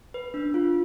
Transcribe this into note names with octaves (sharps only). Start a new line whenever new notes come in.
B4
D4
F4